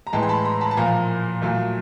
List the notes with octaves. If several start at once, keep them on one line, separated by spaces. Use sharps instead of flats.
A#5
A2 E3 G#3 G5 A5
C6
A5 B5
A#5 C6
A5 B5
A5
A#2 F3 A#3 G#5 A#5
A#2 F#3 A3